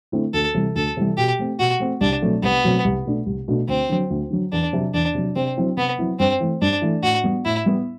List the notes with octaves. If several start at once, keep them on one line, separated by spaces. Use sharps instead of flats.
D3 A3 C4 E4
D2 A4
C3 E3 G3
D2 A4
C3 E3 G3
B2 G4
A3 C4
B2 F#4
A3 C4
C2 D4
B2 F#3 A3 C4
C2 B3
B2 F#3 A3 C4
C2
B2 A3 D4
C2
B2 A3 D4
D2 C4
D3 F#3
D2
D3 F#3
E2 D4
C3 F#3
E2 D4
C3 F#3
C3 C4
F#3 C4 E4
C3 B3
F#3 C4 E4
G2 C4
E3 A3
G2 D4
E3 A3
A2 F#4
G3 B3
A2 E4
G3 B3